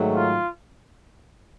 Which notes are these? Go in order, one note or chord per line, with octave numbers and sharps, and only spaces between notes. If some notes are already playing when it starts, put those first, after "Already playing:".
Already playing: G#2 D#3 F#3 A3
F4